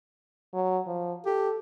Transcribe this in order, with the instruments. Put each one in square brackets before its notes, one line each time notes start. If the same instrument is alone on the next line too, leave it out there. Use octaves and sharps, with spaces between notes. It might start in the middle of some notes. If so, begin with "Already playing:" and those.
[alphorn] F#3
F3
[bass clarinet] G4 [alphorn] A4